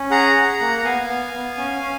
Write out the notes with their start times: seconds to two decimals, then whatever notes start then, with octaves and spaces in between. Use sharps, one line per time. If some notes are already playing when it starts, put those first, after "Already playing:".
Already playing: C#4
0.11 G#4 F#5 A#5
0.36 G#4
0.61 A#3
0.79 A#5
0.84 B3 F5 G#5
1.08 B3
1.34 B3
1.58 C#4
1.82 C#4